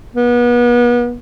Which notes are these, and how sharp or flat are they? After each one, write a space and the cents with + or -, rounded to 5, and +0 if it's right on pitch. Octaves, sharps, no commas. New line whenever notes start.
B3 -35